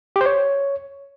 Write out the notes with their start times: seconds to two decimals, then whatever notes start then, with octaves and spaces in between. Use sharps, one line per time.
0.16 G4
0.21 C5
0.26 C#5